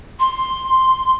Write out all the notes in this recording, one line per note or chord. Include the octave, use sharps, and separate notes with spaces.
C6